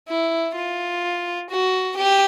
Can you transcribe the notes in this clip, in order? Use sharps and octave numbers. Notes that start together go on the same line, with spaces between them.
E4
F4
F#4
G4